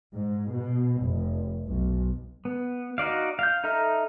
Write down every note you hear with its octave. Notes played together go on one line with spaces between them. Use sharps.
G#2
B2
F1
B1
B3
D#4 F#4 D5 F5
F5 G6
D#4 A4 E5 A#5 F6